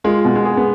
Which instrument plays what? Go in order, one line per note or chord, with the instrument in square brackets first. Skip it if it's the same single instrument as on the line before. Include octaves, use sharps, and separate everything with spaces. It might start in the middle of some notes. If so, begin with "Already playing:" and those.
[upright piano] G#3 [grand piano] F4
[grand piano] B2
[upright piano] G#3
[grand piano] G#4
[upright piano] B3